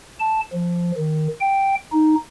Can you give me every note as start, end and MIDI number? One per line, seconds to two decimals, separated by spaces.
0.20 0.40 81
0.53 0.91 53
0.97 1.28 51
1.41 1.75 79
1.92 2.15 63